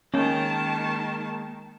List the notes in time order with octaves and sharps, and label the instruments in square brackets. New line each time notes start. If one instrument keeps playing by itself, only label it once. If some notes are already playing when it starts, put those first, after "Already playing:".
[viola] D#3 A5 [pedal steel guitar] G#3 A#3 G5 [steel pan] C#4